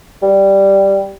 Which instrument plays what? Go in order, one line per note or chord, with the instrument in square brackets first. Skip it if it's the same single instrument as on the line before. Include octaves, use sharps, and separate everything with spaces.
[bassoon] G3